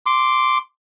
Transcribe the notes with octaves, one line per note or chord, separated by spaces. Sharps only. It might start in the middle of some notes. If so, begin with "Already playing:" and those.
C6 D6